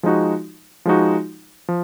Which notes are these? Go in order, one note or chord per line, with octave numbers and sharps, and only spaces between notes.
F3 G#3 D#4 F#4
F3 G#3 D#4 F#4
F3